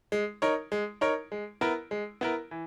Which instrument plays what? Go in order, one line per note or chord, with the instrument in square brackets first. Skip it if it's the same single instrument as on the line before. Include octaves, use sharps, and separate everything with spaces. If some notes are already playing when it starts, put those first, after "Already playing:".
[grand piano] G#3
D#4 A#4 C#5
G#3
D#4 A#4 C#5
G#3
B3 E4 A#4
G#3
B3 E4 A#4
E3